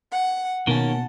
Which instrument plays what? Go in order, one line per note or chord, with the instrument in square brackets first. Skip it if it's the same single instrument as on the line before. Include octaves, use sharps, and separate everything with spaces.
[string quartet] F#5
[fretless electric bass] B2 [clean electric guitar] D#3 A#3 C#4 [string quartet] F#5 A5